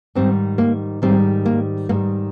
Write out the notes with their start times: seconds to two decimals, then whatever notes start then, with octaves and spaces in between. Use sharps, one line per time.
0.15 G#2 D#3 G3 C4
0.58 A#3
1.02 G#2 D#3 G3 C4
1.45 A#3
1.89 G#2 D#3 G3 A#3